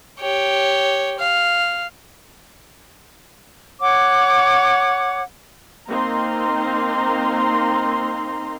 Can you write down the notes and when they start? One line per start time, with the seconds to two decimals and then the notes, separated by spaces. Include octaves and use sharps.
0.20 G4 C#5
1.20 F5
3.80 C#5 F#5 D6
5.89 A#3 C4 D#4 A#5 C6